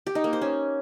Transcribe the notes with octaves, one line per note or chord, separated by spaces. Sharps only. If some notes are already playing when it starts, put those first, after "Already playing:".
G4
D#4
A#3
C5
C#4